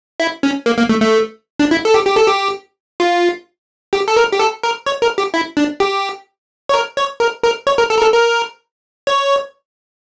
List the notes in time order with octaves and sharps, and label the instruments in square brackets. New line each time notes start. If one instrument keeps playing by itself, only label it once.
[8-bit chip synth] E4
C#4
A#3
A#3
A3
A3
D4
E4
A4
G4
G4
A4
G4
F4
G4
A4
A#4
G4
A4
A#4
C#5
A#4
G4
E4
D4
G4
C#5
A#4
C#5
A#4
A#4
C#5
A#4
A4
A#4
A4
A#4
C#5